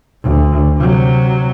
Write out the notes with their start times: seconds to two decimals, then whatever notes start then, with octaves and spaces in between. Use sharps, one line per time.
0.23 D2
0.78 C3 F#3